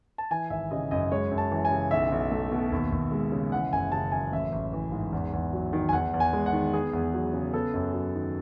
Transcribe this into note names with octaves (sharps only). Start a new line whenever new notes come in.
A5
E3 G#5
G#1 E5
C#3 D#5
F#2 D#5
G#3 C#5
F#2
A5
E3
G#5
C#3
B1 E5
B1
A3
B2
D#2
D#2
G#3
C#3
E3 F#5
F#1 G#5
C#3 A5
F#2 G#5
A1 E5
A1
E3
G#2
E2
E2
F#3
D#3
G#5
E2 F#5
E2
G#5
G#3
F#5
D#3
B3 G#4
E2
F#3
C#3
B3 A4
F#2
F#3
D#3